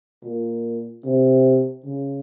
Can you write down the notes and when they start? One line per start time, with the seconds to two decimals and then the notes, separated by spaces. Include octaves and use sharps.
0.24 A#2
1.05 C3
1.86 C#3